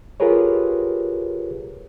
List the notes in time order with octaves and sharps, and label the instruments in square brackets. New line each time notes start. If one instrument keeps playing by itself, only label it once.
[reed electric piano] F4 G4 G#4 A#4 B4 C#5